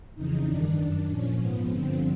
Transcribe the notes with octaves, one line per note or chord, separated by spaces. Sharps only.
F2 C#3 E3 D#4
G2 D#3 D4
F#2 D#3 D4
A#2 F3 C#4
G#2 F3 B3
G2 D3 F3 C4